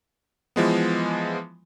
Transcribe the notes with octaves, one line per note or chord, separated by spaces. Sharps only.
E3 F3 G#3 B3